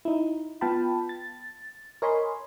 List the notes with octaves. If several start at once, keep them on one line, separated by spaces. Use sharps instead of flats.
D#4 E4
B3 F4 F5 G5 A5 B5
A6
A#4 C#5 D#5 G#5 B5 C6